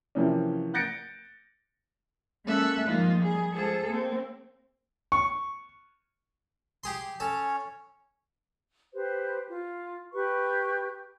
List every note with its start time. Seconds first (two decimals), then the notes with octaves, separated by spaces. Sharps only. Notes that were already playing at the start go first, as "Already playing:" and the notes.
0.15 C3 E3 F3 A#3 C#4
0.74 F#6 G6 A6 A#6 C#7 D7
2.45 G#3 A#3 C#4 A4 E5 F#6
2.86 D#3 F3 G#3 A#3 D#4 F4
3.21 G3 G#4
3.55 F3 G#3 G#4 A4
3.89 A#3 C4
5.12 C#6
6.84 G4 G#4 C6
7.20 C#4 A4 C#5
8.94 G4 B4 C5
9.49 F4
10.14 G4 B4 C#6